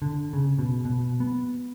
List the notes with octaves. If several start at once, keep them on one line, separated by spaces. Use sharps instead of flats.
D3
C#3
B2
B2
B3